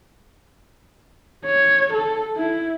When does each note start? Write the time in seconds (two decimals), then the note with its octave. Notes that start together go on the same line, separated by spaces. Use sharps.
1.46 C#5
1.93 A4
2.36 E4